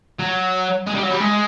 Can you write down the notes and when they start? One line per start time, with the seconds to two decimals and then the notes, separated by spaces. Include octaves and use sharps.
0.19 F#3
0.87 G#3
0.95 G3
1.03 F#3
1.11 G3
1.20 G#3